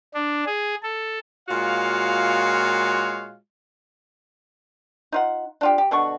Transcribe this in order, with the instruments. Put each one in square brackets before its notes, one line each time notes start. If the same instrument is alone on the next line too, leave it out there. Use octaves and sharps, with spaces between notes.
[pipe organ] D4
G#4
A4
[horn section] A#2 G#3 F4 F#4 C#5 F5
[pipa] D#4 F4 F#5
D4 F4 G4
G4
B2 D3 F#4 C#6